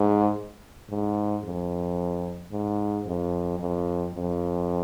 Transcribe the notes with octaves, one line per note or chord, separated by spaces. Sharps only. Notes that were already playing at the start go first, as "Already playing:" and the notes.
Already playing: G#2
G#2
F2
G#2
F2
F2
F2